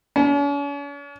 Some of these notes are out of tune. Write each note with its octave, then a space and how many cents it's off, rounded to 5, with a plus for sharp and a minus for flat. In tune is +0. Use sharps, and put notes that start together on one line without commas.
C#4 +45